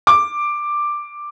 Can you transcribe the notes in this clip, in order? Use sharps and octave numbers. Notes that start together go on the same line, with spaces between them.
D6